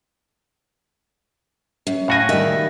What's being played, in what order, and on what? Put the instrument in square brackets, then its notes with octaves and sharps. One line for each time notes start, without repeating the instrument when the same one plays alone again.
[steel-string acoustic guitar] F#2
[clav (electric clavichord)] A2 F#4 G#5 [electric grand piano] F5 A#6
[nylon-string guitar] D#3 G3 [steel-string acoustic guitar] E5